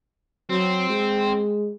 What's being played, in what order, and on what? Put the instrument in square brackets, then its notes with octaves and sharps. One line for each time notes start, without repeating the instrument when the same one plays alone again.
[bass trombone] F#3 [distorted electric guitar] C4
[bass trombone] G#3